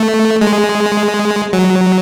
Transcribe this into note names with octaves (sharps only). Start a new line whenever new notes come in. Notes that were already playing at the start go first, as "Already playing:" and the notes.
Already playing: A3
G#3
F#3